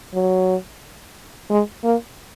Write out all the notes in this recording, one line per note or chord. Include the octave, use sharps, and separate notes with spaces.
F#3
G#3
A#3